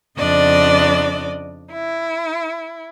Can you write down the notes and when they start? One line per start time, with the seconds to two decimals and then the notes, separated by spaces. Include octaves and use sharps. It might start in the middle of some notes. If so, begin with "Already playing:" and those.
0.18 F2 C#3 D4 D5 D#5
1.72 E4